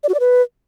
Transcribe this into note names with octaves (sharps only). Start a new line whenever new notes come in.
D5
F#4
D5
B4